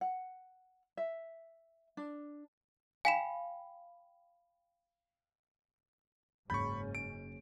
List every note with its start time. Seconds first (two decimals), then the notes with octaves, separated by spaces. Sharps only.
0.01 F#5
0.97 E5
1.97 D4
3.05 F5 G5 G#5 B5 B6 E7
6.50 F#1 G#2 C#4 B5 C#6 G6 A6
6.95 D7